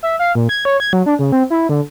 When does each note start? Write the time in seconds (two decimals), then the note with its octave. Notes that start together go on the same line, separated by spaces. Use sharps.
0.03 E5
0.19 F5
0.35 A#2
0.49 G#6
0.65 C#5
0.80 G#6
0.93 F#3
1.06 D4
1.19 C#3
1.32 C4
1.50 E4
1.69 D3